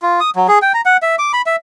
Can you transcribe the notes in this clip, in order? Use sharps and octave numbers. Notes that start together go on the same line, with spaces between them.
F4
D#6
F#3
G#4
G5
A#5
F#5
E5
D6
B5
E5